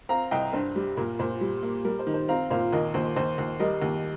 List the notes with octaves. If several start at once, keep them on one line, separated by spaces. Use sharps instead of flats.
C4 F5 A#5
C2 D#5 G5
G2 C5
G3
A#2 A#4
A#2 C5
G3
A#3
G3 A#4
C5
D#3
C5
C4 F5 A#5
A#2 C5 F5
D#2 A#4 D#5
D#2 C5
D#2 C5
D#2
G3 A#4 D#5
D#2